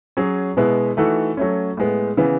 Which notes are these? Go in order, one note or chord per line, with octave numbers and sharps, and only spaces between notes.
F#3 C#4 G#4
B2 G#3 B3 E4 B4
E3 A3 D#4 F#4 A4
F#3 A3 C#4
A2 G#3 B3
C#3 E3 B3